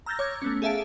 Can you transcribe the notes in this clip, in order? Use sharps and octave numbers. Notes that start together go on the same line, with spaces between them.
A#5 E6 F6 G6 A6 A#6
C#5 D6 F6 G6 G#6
A3 B3 C#4
G#4 A4 E5 F5 A5 D7